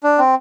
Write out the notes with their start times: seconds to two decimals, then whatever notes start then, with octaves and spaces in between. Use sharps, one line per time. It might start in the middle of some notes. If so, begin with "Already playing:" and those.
0.04 D4
0.19 C4